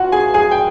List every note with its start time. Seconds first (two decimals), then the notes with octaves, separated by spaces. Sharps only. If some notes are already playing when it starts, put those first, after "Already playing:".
Already playing: F4 F#4 F5 F#5
0.12 G#4 G#5
0.34 G#4 G#5
0.51 G5